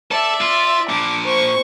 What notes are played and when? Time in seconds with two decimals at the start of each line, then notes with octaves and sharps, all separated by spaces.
0.11 A4 D5 E5
0.41 F4
0.89 A#2 D4 D6
1.25 C5 C#6